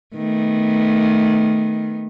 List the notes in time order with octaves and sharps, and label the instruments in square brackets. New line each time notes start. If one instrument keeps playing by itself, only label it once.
[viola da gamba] D#3 A3 B3